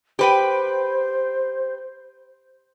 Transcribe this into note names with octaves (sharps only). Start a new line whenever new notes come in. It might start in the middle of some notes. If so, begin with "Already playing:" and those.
G4 B4 C5 G5